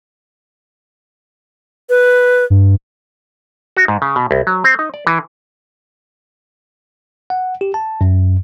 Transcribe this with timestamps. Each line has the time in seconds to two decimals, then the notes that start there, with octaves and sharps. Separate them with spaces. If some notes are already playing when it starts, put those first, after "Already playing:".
1.89 B4
2.50 G2
3.77 F#4
3.88 G#2
4.02 C#3
4.16 B2
4.31 C2
4.47 F#3
4.64 C4
4.79 D#4
4.94 D5
5.07 E3
7.30 F#5
7.61 G4
7.74 A5
8.01 F#2